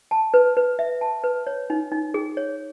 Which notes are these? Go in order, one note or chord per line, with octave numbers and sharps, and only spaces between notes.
A5
B4
B4
E5
A5
B4
C#5
D#4
D#4
G#4
C#5